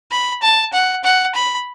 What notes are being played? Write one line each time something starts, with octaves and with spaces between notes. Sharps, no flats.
B5
A5
F#5
F#5
B5